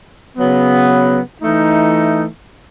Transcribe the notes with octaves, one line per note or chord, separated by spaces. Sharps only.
C#3 F#3 B3
E3 A3 D#4